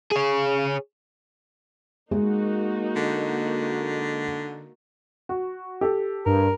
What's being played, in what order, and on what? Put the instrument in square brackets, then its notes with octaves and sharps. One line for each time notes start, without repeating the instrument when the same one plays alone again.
[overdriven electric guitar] G#4 C#5
[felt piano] G#3 [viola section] A#3 D#4 F#4
[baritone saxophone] D3
[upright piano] F#4
G4 A4
[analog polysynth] G2 [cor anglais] A#4